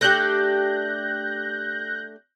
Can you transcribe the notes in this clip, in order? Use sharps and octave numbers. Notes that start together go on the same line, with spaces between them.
A3 D4 G4 F#6 G6 A#6